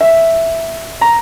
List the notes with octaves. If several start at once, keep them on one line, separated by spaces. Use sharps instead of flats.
E5
A#5